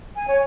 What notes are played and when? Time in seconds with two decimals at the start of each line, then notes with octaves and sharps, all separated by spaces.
0.16 G#5
0.28 C#5